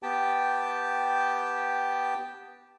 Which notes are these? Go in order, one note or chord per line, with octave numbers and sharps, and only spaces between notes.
B3 G4 G5 A5